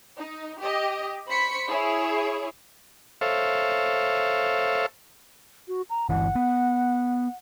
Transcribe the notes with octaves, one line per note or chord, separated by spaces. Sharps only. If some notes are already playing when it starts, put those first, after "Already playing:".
D#4
G4 D#5
C5 B5 C#6 B6 C#7
E4 G#4 C#5
A4 C5 C#5 E5 F5
F#4
A#5
G1 E3 F#5
B3